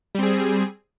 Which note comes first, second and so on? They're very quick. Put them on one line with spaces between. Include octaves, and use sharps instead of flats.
G3 C4 G#4